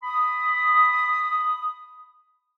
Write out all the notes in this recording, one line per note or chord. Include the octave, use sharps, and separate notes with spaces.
B5 D#6